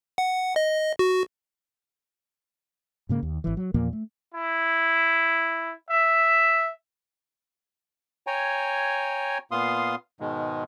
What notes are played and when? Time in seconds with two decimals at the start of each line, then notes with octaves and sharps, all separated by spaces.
0.18 F#5
0.56 D#5
0.99 F#4
3.09 G#2 C#3 A#3
3.23 D#2
3.44 G#1 E3
3.57 F#3
3.74 E2 A#2 F3 A#3
3.93 A3
4.34 E4
5.90 E5
8.27 C#5 G5 G#5 A#5
9.51 A#2 B3 F5 C6 D#6
10.20 G#2 B2 D#3 G#3